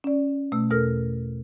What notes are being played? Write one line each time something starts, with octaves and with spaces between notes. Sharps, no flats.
C#4 D5
B2 A3 E6
E2 B2 A4 A#4 F6 A#6